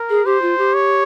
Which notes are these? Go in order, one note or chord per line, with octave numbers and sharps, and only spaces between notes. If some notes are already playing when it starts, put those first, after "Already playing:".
Already playing: A#4
G#4
G4 C5
F4
G4
C#5